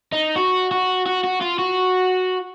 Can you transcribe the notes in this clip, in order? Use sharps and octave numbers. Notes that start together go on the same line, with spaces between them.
D#4
F#4
F#4
F#4
F#4
F4
F#4